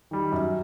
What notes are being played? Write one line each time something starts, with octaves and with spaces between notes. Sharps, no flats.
D#3 G3
F#2